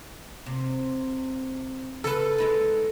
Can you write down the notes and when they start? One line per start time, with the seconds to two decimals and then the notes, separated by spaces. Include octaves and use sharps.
0.46 C3
2.04 C#3 A4 B4
2.38 G#3 D#4 B4